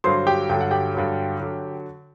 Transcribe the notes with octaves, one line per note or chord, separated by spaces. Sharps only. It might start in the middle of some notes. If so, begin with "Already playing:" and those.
G2 D3 F#3 C5 C6
G4 G5
G2 D3 F#3 G5
F#5
G4 G5
G2 D3 F#3
D3 F#3